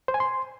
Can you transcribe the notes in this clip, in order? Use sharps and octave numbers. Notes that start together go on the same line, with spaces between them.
C5
G#5
C6